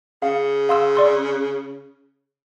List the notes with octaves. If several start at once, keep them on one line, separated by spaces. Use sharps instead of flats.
C#3 F5
F5 C6 E6
D5 C6 E6